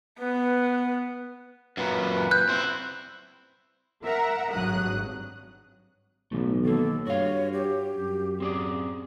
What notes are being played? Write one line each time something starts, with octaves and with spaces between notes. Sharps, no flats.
B3 B4
F#2 A#2 B4
F#6 G6
C4 E4 C6
A#4 E5 F#5 A#5
G#1 G2 F#3 D#6 F#6
B1 E3 A3
D#3 A#3 A4
G2 F#4 C#5 F5
G4
F#2
C4 G#4 D5